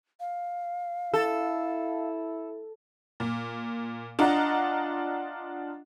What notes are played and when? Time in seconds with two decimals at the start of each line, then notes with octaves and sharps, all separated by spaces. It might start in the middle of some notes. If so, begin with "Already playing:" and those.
0.20 F5
1.14 E4 A4
3.20 A#2
4.19 D4 F4 D#5 F#5 A#5